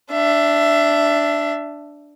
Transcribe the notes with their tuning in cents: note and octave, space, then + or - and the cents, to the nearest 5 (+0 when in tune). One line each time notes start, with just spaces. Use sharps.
D4 +0 E5 +15